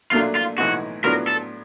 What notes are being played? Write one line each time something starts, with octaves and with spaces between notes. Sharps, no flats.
A#2 F#3 A3 D4 F4
F4
B1 A2 E3 G#3 F#4
A2 F#3 B3 D4 F4 A#4
A4